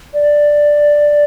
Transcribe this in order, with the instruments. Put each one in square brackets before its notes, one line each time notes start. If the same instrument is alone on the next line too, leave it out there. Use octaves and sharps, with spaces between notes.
[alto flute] D5